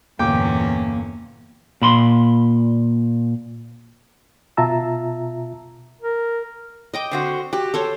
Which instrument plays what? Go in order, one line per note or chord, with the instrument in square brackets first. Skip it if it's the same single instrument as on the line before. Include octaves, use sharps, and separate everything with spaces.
[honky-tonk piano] G1 [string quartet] E2 A#2 C#4 [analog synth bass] A#3 [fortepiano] G5 D6
[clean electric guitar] A#2 B5 C6
[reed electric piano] B2 F4 E5 A5 A#5 E6
[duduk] A#4
[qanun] D#5 G5 D6
[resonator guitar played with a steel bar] D3 C4 F#4
[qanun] F#4 [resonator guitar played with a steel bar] G4
[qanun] A4 C5 C#5